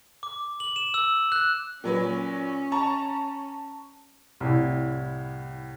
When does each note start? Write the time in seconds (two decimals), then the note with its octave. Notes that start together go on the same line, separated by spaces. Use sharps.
0.23 D6
0.60 F#7
0.76 E7
0.94 E6
1.32 F#6
1.84 A#2 F#3 C#4 B4
2.72 A5 A#5 C#6
4.40 C2 A2